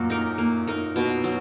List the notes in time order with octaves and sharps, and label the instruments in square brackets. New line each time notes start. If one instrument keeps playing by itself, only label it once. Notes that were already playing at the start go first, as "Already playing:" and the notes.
Already playing: [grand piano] F#2 A#2 [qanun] A#3 F#4
[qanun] D#4 A#4
A#3
D#4 A#4
B2
F#3